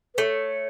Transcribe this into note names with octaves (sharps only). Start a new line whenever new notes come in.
B4
A3 C#5